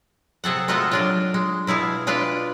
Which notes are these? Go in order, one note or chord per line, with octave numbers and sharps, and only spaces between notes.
C3 G#4 A4 F#5
G#3 A3 F4 F#4 A4 D#5
F#3 D4 F4
G#3
B2 E4 G#4 F5
G#3 D4 F4 B4 F5